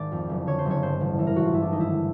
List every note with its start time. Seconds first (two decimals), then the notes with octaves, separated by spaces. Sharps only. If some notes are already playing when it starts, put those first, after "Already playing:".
Already playing: G#1 D5
0.12 F2
0.30 F#1
0.47 D3 C#5
0.59 C5
0.66 F#1 C#5
0.83 G2 C5
1.01 A1
1.19 E3
1.27 A#4
1.36 A1 F#4
1.45 F4
1.53 G2 E4
1.62 D4
1.72 G#1 D#4
1.80 E4
1.90 D3